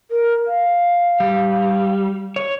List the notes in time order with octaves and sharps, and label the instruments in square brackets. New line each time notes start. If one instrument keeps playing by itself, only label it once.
[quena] A#4
F5
[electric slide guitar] G3
C#5